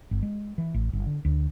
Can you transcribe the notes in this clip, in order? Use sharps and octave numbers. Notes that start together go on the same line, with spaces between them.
G1
G#3
E3
A1
G1
D3
D2